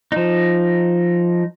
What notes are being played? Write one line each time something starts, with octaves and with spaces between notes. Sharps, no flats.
F3 D#4